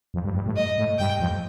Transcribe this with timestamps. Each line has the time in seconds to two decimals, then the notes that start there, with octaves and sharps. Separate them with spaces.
0.14 F2
0.25 G2
0.35 G2
0.46 A2
0.56 D#5
0.78 A2
0.98 G2 G5
1.20 F2